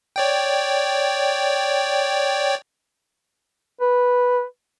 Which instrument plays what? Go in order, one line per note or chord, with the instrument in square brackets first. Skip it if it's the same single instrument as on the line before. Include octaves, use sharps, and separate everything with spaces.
[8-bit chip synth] C#5 D5 G5
[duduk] B4